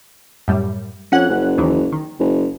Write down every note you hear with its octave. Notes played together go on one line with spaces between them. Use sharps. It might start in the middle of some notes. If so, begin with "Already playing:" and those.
F#2 A2 G3
F2 C#4 F#5 F#6
F#1
D#2 D#3 E3
D#3
F#1